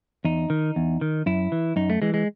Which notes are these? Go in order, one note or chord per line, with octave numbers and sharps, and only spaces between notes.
E2 D#4
D#3
E2
D#3
F#2 E4
E3
F#2 D#4
A3
E3 G#3
G#3